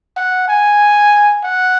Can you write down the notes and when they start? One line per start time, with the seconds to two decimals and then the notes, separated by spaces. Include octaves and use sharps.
0.16 F#5
0.48 G#5
1.44 F#5